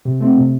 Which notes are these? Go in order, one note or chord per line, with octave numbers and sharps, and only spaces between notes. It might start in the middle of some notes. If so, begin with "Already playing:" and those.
C3
A3 C4
C3